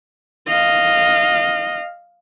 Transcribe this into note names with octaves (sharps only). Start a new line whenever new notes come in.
D#5 F5